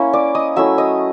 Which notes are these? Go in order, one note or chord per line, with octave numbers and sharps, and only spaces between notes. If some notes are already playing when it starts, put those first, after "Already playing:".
Already playing: A#3 C#4 E4
D5 D6
D#5 D#6
F#3 A3 C#4 E4 E5 E6
D#5 D#6